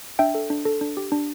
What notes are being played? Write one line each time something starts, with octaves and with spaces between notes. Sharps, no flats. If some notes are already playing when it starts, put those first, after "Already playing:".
D4 E5 G5
A4
D4
A4
D4
G4
D4